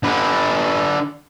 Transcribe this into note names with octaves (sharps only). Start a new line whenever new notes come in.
D3 B4